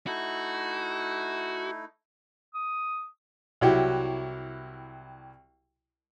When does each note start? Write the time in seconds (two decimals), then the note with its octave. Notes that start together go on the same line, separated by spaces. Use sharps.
0.07 A3 D#4 E4 F#4
2.54 D#6
3.61 C2 F#3 E4 F#4 G4